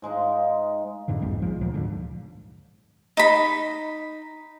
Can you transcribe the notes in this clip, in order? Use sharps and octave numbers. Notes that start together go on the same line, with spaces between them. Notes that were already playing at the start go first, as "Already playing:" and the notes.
G#2 G#3 D#4 F5
F2 G#2 D3 E3
A#1 E2 G#2 G3
F3 G#3
D2 A#2 F3 F#3
G#2 D3 F3
D#4 B5